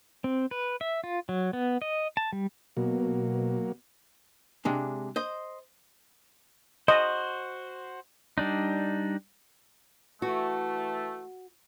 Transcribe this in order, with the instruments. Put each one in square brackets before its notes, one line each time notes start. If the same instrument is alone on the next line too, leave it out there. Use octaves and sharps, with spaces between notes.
[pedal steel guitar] C4
B4
E5
F4
F#3
B3
D#5
A5
G3
[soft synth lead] B2 [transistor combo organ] F#3 A#3
[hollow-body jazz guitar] C3 G#3 D4
C5 D#5
[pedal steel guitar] F#4 C5 [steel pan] D#5
[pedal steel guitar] G3 D4 D#4
[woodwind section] E3 A3 [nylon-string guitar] F#4